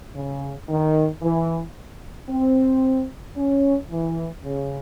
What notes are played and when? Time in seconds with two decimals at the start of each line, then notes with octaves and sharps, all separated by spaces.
0.15 C#3
0.69 D#3
1.23 E3
2.29 C4
3.37 C#4
3.90 E3
4.44 C#3